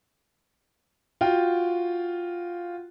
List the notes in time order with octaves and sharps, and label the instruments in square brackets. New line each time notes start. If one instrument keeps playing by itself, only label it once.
[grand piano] F4 F#4 G5